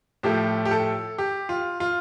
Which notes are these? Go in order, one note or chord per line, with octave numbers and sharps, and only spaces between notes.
A2 F3 A3 G4
G4
A4
G4
F4
F4